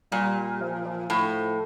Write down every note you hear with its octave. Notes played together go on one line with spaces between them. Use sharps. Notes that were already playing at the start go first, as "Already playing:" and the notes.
A#2 G3
F3
F3
A2